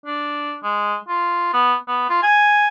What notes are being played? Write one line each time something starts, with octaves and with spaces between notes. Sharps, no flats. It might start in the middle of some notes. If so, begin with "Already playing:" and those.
D4
G#3
F4
B3
B3
F4
G#5